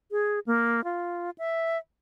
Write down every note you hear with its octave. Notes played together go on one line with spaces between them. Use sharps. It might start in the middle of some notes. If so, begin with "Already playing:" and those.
G#4
A#3
F4
E5